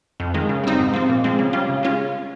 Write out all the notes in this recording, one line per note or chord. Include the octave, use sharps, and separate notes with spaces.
F2
D#3 G#3
C#3
G3 C4 D#4
G#2
F3 C4
A#2
F3 G#3 C4
C#3
G3 C#4 F4
C#3
G#3 C#4 F4